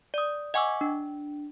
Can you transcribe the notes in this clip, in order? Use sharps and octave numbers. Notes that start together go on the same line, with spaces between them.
D5 D#6
D#5 F#5 G#5 C#6 D6 E6
D4